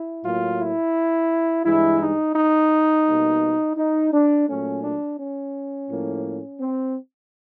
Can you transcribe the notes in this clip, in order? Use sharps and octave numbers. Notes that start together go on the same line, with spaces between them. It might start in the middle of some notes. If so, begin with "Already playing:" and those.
Already playing: E4
A2 F#3 A#3 F4
E4
G2 E3 G#3 E4
D#4
D#4
B2 G3 A#3
D#4
D4
A#2 F#3 A3 C#4
D4
C#4
A2 F3 A#3
C4